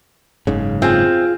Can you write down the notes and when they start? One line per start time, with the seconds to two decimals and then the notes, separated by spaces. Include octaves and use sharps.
0.47 F#1 G#2 C#3
0.82 C4 F4 G#4 G#5